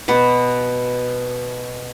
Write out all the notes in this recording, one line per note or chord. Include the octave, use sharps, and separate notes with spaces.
B2 F#4 B4